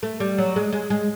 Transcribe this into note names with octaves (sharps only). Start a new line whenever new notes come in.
A3
G3
F#3
G#3
G#3
G#3